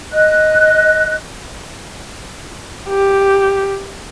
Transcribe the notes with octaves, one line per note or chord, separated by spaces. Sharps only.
D#5 F#6
G4